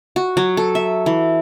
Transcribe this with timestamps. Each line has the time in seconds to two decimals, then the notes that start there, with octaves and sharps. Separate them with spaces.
0.16 F#4
0.37 F#3
0.57 A4
0.75 E5
1.06 E3